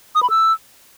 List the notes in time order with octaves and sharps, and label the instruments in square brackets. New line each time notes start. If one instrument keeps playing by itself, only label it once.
[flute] D#6
B5
E6